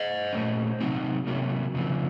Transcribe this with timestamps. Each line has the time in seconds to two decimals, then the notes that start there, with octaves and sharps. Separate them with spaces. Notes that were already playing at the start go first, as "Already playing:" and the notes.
Already playing: C5 D#5
0.33 A#2 A3 C#4
0.80 C3 F#3 C4 D#4
1.27 C3 F#3 A#3 C#4
1.74 F2 C#3 F3 C4